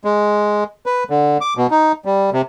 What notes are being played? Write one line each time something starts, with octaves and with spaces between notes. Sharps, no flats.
G#3
B4
D3
D6
B2
D#4
G3
C3